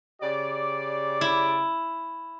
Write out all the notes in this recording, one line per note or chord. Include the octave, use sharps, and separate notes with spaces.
C#3 G4 D5
E4